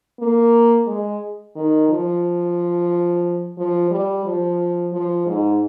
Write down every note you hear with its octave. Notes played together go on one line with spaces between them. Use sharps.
A#3
G#3
D#3
F3
F3
G3
F3
F3
G#2